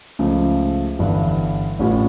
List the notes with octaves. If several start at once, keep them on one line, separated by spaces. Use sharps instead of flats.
C#2 C#3 F3 A3
G1 G2 E3
A1 A2 G3 C#4 F4